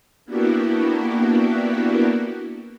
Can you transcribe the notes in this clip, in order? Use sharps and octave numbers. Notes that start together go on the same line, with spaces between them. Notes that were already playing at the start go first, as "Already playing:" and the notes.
A#3 B3 D4 E4 F#4 G4